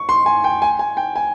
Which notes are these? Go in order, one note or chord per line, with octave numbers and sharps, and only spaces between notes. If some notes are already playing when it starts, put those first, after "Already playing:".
Already playing: C#6
C6
G#5
G5
G#5
G#5
G5
G#5